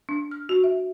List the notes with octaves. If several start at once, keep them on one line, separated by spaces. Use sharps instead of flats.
D4
F6
F#4
E5